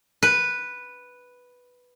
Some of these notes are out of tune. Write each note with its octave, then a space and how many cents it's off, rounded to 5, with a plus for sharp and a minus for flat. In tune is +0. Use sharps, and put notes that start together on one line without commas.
B4 +0